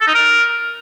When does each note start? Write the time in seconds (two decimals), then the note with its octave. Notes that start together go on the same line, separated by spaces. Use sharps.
0.01 A4
0.08 D#4
0.15 A#4